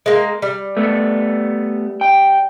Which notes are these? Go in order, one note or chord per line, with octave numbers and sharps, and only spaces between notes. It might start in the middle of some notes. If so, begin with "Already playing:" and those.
G#3 A#3
G3
A3 B3
G5